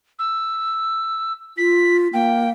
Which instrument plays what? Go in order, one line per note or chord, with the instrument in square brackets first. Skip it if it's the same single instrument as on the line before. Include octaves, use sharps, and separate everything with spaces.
[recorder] E6
[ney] F4 [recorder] B6
[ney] A#3 [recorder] G5